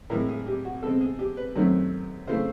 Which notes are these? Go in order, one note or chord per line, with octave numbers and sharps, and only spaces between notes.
A2 E3 G#3 A#4
G#4
G4
F#4
B2 G#3 C4 A4
G#4
G4
B4
F#2 D#3 F#3 A3 C4
C#3 E3 A3 C5